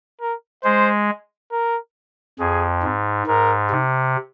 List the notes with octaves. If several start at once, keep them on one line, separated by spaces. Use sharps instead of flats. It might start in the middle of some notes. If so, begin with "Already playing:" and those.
A#4
G#3 C5
A#4
F2 G#4
G#2
G#2 A#4
C3